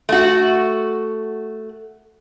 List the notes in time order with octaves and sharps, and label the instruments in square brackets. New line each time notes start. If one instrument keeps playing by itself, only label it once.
[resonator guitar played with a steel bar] A3 F#4